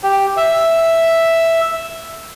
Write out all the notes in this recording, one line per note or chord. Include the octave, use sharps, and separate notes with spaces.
G4
E5